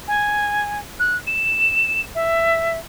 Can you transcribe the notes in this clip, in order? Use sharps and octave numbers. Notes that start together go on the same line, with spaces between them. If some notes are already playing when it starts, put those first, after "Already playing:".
G#5
F#6
E7
E5